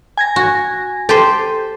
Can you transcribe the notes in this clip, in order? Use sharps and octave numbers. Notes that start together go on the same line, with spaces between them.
G#5 G#6 A#6
F#4
G4 A4 C5